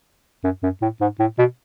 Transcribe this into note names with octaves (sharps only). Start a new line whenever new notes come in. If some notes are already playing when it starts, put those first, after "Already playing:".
F#2
F#2
A2
G#2
A2
B2